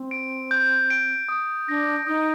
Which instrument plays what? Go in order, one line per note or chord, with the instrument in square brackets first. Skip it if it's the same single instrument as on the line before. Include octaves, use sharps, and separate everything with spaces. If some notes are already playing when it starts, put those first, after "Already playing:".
Already playing: [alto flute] C4
[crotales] D7
G6
D7
D#6
[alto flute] D4 [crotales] A#6
[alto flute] D#4 [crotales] D#6